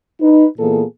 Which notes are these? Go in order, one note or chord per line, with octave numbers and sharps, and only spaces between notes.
D#4 B4
A#2 E3 A#3 B3 G#4 A4